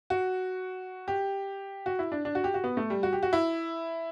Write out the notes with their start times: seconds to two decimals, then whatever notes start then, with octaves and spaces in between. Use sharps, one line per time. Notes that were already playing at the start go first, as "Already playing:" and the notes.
0.10 F#4
1.08 G4
1.86 F#4
1.99 E4
2.12 D4
2.25 D4
2.35 F#4
2.44 G4
2.54 F#4
2.64 B3
2.77 A3
2.90 G3
3.03 F#4
3.13 G4
3.23 F#4
3.33 E4